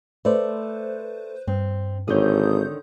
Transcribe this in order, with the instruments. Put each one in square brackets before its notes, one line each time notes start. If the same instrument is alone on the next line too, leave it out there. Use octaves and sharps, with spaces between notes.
[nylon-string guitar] A3 D5 [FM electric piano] B4 C5
[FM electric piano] G2 [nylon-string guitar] C4
[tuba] G#1 [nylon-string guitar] D3 D#3 C#5 [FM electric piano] D#6 G6